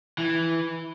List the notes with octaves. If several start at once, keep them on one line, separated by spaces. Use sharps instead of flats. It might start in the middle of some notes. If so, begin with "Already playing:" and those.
E3